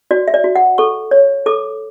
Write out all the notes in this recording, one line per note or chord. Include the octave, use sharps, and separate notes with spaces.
F#4 D5
E5
D5
F#4
F#5
A4 C#6
C#5
A4 D6